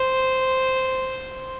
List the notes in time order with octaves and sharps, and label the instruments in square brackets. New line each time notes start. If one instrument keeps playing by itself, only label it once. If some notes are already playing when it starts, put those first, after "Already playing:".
Already playing: [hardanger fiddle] C5